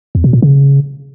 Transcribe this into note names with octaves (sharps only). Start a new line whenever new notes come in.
E2
B2
A#2
C#3